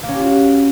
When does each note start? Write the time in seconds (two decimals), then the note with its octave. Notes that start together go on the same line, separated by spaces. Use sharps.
0.03 A#3
0.09 C#4
0.14 G4
0.20 F4
0.25 F#4